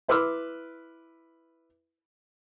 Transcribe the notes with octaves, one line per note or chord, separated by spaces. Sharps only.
E4 B4 C6 D6 E6 F6